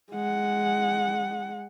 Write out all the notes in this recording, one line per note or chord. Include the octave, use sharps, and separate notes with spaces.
G#3 F#5